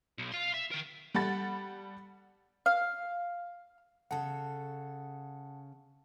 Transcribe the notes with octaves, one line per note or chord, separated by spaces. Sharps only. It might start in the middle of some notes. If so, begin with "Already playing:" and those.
B1
F5 C6
E5
A#4 G5
G3 A4 F#5 B5 A6
F5
C#3 A4 F#5 A5